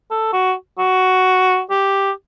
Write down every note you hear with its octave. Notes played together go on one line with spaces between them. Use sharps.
A4
F#4
F#4
G4